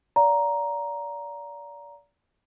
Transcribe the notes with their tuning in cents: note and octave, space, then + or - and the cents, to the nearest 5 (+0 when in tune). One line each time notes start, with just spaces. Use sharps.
D5 -30 F5 +5 A#5 +5